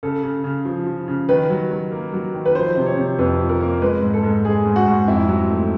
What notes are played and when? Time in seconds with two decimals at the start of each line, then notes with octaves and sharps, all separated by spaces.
0.03 C#3 A4
0.23 C#3
0.44 C#3
0.65 F3
0.87 F3
1.08 C#3
1.29 D#3 B4
1.50 F#3
1.71 F#3
1.92 A#3
2.13 F#3
2.34 D#3
2.45 B4
2.55 F3 C5
2.76 C3
2.86 C#5
2.97 C3
3.19 F2 B4
3.39 F3
3.49 A#4
3.60 A#3
3.82 G#3 B4
4.02 G#2
4.13 A4
4.23 G#2
4.44 G#3 G#4
4.65 G#2
4.76 F#4
4.87 G#2
5.08 F2 E4
5.29 F#3
5.50 A3